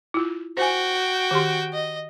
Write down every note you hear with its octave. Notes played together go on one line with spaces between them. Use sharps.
E4 F4
F#4 C5 G5 G#5
D#3 G4 C6
D#5